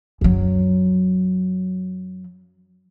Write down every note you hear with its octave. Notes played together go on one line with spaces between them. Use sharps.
F#2 F#3